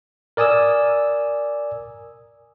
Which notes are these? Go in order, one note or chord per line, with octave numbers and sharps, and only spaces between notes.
A#4 D5 G#5 D#6 E6